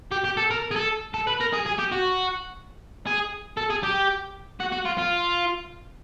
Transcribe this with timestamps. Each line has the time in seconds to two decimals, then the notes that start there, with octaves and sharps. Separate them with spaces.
0.11 G4
0.24 G4
0.37 A4
0.51 A#4
0.71 G#4
0.76 A4
1.14 A4
1.27 B4
1.40 A#4
1.53 G#4
1.66 G#4
1.78 G4
1.92 F#4
3.06 G#4
3.57 A4
3.70 G#4
3.83 G4
4.60 F#4
4.72 F#4
4.86 F4
4.98 F4